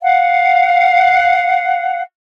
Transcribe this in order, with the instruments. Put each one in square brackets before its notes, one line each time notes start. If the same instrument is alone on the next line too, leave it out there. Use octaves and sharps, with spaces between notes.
[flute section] F5 F#5